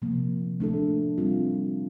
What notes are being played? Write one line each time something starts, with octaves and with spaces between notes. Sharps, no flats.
C3 F3 A#3
A3 D4 A4
G3 C4 F4